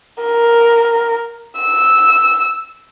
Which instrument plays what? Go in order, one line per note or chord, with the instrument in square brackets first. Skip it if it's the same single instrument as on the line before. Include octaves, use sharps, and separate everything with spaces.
[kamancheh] A#4
E6